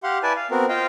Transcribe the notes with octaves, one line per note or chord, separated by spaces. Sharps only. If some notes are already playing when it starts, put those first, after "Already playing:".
G4 F5 F#5 C6
E4 B4 D5 G#5 A5
F5
B3 C4 F#4 A#4
F4 C5 D#5 F5 G5